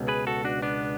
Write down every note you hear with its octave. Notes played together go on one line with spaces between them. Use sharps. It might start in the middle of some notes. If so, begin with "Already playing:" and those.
Already playing: C#2 B2
G#4 B4
F#4 A4
D4 F#4
B3 D4